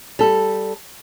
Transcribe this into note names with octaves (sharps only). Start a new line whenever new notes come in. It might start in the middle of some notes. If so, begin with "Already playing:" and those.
G3 A4